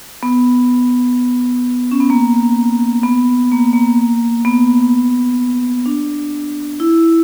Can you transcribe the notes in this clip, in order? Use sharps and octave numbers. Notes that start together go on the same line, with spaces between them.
B3
C#4
B3
A#3
B3
A#3
A#3
B3
D4
E4